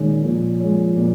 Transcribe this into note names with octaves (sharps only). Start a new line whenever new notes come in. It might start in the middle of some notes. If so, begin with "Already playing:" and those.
Already playing: A#2 D#3 G#3 C#4
A#2 F3
G#3 C#4
A#2